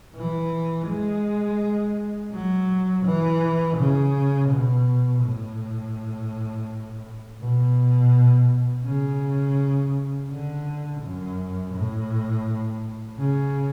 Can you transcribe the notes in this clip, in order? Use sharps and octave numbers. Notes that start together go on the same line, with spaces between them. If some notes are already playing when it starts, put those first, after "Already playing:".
E3
G#3
F#3
E3
C#3
B2
A2
B2
C#3
D3
F#2
A2
C#3